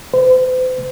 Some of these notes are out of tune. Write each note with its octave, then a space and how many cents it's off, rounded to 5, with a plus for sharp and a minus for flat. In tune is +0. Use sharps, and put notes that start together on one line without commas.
C5 -40